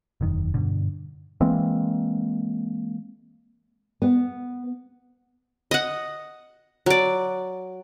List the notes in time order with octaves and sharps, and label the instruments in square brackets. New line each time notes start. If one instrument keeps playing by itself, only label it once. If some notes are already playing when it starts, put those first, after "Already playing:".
[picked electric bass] E1 F#2 D#3
G2 B2 D3
E3 G#3 A#3 C4
[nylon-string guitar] B3
[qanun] D#5 F#5
F#3 D5